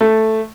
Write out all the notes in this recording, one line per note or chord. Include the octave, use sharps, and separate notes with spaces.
A3